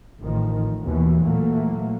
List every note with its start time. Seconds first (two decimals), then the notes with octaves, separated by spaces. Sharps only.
0.20 A1 A2 D#3 F3
0.82 D#2 B2 E3
1.22 A#2 E3 F#3 A3 A#3